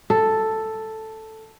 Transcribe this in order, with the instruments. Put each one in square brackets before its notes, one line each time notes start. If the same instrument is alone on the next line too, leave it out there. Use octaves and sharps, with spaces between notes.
[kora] A4